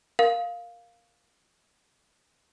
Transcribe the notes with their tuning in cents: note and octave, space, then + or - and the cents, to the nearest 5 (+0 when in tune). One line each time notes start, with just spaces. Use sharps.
A#4 +0 F5 +5